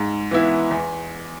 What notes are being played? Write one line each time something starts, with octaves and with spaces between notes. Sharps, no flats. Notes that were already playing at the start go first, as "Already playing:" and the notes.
Already playing: G#2
E3 B3 E4
E2